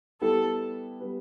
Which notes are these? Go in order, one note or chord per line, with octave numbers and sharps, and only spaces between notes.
G3 B3 E4 G4 A4
G3 B3 G4 B4